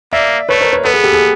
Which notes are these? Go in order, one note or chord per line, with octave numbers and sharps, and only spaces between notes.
A#3 D5 E5
A3 B4 C#5
A#4 C5
B4 C#5
B3 A4 B4
G#4
G4 A4
G#4